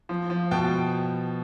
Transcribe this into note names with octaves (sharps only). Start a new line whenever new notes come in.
F3
F3
B2 G5 A5